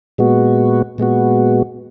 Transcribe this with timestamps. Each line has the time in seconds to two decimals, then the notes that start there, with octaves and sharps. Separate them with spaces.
0.18 A#2 G#3 B3 F#4
0.98 A#2 G#3 B3 F#4